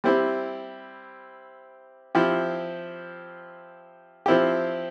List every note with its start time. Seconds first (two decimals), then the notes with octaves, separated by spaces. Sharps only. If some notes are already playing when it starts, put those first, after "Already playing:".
0.04 G3 C4 E4 G4
2.15 F3 C4 E4 G4
4.26 F3 C4 E4 G4